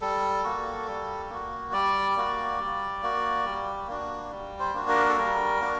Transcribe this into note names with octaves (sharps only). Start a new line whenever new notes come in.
G3 A4
A#3 F#4
G3
A#3 F#4
G3 D5
A#3 F#4
G3
A#3 F#4
G3
A#3 D4 F#4
G3
C5
A#3 D4 F#4
A#4
A4
G3 A#4
A#3 D4 F#4